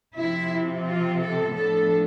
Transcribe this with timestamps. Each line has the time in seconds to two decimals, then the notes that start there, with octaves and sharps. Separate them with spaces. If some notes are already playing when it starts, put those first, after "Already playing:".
0.17 C3 F3 C4 E4
0.86 F4
1.21 A4
1.55 A2 F3 B3 D4 A4